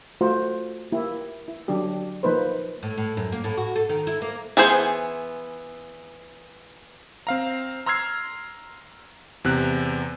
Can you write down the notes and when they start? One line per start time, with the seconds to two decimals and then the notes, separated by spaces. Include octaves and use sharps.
0.21 A3 F4 F#4 C5
0.92 A#3 E4 G4
1.48 E4
1.68 D3 F#3 C#4 D4 G4
2.23 F3 A#3 D#4 B4 C5
2.83 A2
2.97 A2
3.17 F#2
3.32 A#3
3.44 A2
3.57 F#4
3.76 A4
3.89 D#3
4.07 E4
4.22 A#3
4.57 E3 B3 G#4 C5
7.27 C4 F5 A#5
7.86 A#5 C6 E6 F6 G#6 C7
9.44 E2 C3 F#6